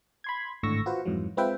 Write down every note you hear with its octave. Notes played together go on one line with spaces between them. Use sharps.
B5 C6 G#6
G#1 A2 D3 C#6 E6 A#6
F4 F#4 B4 C5
F2 G#2 E3 F#3
G#3 C4 F4 B4 E5 G5